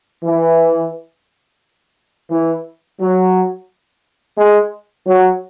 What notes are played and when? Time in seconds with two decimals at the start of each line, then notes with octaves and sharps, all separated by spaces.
0.23 E3
2.30 E3
2.99 F#3
4.37 G#3
5.07 F#3